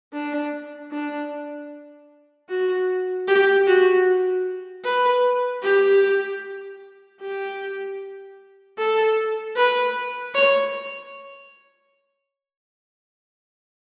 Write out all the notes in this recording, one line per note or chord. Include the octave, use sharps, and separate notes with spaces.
D4
D4
F#4
G4
F#4
B4
G4
G4
A4
B4
C#5